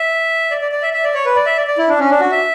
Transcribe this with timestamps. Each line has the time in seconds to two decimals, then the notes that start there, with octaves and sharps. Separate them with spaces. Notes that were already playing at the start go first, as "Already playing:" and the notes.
Already playing: E5
0.51 D5
0.61 D5
0.72 D5
0.82 E5
0.93 E5
1.04 D5
1.14 C#5
1.25 B4
1.36 D5
1.46 E5
1.57 D5
1.67 D5
1.78 E4
1.88 D4
1.99 C#4
2.10 D4
2.20 F#4
2.31 E5